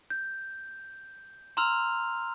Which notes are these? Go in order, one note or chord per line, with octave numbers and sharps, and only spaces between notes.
G6
A#5 C6 E6 F6 F7